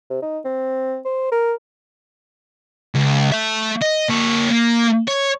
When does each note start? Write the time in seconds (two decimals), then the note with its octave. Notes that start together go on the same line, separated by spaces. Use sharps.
0.10 C3
0.22 D#4
0.45 C4
1.05 C5
1.32 A#4
2.95 C#2
3.32 A3 E5
3.82 D#5
4.10 A#3 C#5
4.50 A#3
5.08 C#5